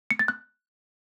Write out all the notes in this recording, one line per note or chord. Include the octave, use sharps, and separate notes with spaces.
C#7
A6
F#6